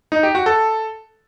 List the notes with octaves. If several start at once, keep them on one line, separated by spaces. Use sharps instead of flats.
D#4
G4
F#4
A4